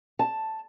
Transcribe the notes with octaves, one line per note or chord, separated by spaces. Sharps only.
A5